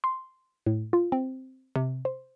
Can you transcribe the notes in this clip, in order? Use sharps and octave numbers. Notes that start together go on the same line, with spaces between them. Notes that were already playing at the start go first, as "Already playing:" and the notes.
C6
A2
F4
C4
C3
C5